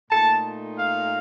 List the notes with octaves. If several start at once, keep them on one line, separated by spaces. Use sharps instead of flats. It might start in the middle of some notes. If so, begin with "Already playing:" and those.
A#2 A3 D#4 A5
F5